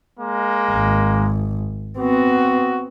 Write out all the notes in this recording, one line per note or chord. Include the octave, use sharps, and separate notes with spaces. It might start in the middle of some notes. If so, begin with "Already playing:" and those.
G#3 A#3
G#1
B3 C4 F#4